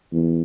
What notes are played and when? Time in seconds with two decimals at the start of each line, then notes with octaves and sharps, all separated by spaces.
0.13 E2